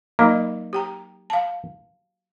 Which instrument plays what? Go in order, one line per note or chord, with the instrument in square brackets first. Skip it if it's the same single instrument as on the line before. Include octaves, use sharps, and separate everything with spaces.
[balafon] F#3 D#4 D#5 [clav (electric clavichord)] A#3
[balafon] G4 G5 A#5
F5 A5